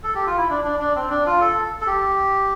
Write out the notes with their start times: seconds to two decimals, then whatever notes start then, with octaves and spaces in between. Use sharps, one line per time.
0.04 A4
0.15 G4
0.27 F4
0.37 E4
0.49 D4
0.64 D4
0.79 D4
0.96 C4
1.10 D4
1.26 F4
1.40 A4
1.81 A4
1.87 G4